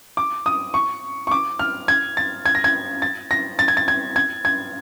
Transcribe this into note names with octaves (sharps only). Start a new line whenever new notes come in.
D6
D#6
C#6
C#6
D6
F6
G#6
A6
G#6
A#6
G#6
A6
A#6
A6
G#6
A6
G#6
G#6
G#6